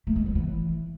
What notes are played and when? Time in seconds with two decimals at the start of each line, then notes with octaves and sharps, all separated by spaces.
0.07 A3
0.16 G#3
0.26 F#3
0.35 E3